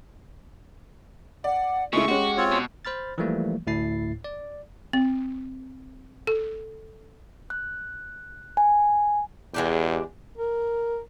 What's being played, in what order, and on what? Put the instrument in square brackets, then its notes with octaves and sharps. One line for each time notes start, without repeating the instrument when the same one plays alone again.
[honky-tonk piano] D5 [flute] F#5
[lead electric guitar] C#3 [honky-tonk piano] G#3 A3 E4 [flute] F4 [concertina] C#6
[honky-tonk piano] G#3 C#4 [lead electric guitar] F#4 [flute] G4
[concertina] C4 F4 C#5
[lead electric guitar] B2
[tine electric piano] C5 B5 F6 A6
E3 F3 G3 A3 A#3
D2 A2 E4 A6 C7
D5
[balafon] C4
A4
[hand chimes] F#6
G#5
[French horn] E2 [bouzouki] G#3 D4 G4
[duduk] A#4